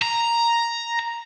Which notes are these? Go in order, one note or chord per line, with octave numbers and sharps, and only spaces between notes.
A#5